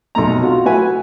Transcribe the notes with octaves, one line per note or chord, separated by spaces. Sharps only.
B1 C3 A3 A#5
F4 F#4
A3 E4 F#4 B4 G#5